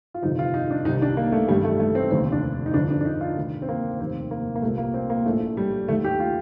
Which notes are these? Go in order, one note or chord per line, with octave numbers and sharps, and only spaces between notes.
F4
G1 F2 C3 D#3 D#4
F4
D#4
D4
C2 C3 D#3 D#4
D#4
D4
A#3
A3
A1 G2 D#3 G3
A3
A3
C4
F1 D#2 D3 C4
D4
D#4
G1 F2 D3 D4
D4
D4
D#4
F4
D2 C3 D#3
C4
A#3
F1 D#2 D#3 C4
A#3
A#3
C2 A#2 A3
A#3
C4
A#3
A#1 A2 A3
G3
D#2 D#3 A3
G4
F4